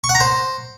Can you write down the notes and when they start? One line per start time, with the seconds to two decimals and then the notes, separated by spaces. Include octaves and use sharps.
0.04 C#6
0.09 F#5
0.15 A#5
0.20 C5